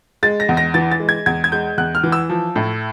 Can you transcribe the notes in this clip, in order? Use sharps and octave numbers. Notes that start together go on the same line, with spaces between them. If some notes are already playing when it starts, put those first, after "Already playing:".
G#3 A6
A#6
E2
A#6
E3 A6
A6
G#3
G#6
E2 G#6
G#6
G#3 G6
E2 F#6
F6
E3
E6
F3
A2